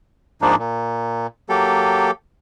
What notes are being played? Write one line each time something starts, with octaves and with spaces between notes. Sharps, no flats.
G#2 F3 G#3 A#3 D4 D#4
A#2
F#3 A#3 G4 A4